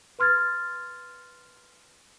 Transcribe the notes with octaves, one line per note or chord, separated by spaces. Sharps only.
B4 C6 F6 G#6 A6